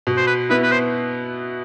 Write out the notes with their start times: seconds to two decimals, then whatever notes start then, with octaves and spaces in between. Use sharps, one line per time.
0.07 B2
0.17 C5
0.27 B4
0.49 B3 E4 B4
0.63 B4
0.72 C5